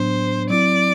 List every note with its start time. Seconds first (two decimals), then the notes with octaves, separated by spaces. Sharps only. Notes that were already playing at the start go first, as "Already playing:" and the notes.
Already playing: A2 F#3 B3 D4 C5
0.50 F#3 C4 E4 D5